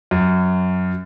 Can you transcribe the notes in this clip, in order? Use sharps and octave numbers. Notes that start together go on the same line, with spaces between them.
F#2